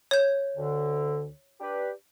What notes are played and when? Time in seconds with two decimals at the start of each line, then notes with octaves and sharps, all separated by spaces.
0.11 C#5 G6
0.56 D2 D3
1.60 D4 G4 B4